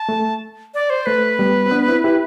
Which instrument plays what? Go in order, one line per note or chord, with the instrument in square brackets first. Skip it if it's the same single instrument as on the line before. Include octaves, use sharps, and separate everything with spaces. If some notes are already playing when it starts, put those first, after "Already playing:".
Already playing: [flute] A5
[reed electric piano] A3
[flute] D5
C5
[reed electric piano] A3 [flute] B4
[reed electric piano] G3 B3
C4
B3 D4
C4 E4
E4 G4